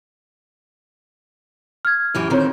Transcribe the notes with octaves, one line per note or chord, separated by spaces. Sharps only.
F6 G#6
F#2 E3 G4
D3 D#3 C4 F4 C#5